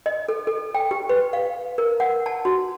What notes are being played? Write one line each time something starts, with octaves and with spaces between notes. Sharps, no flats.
D#5
A4
A4
G5
G4
B4
F5
A#4
F#5
A5
F#4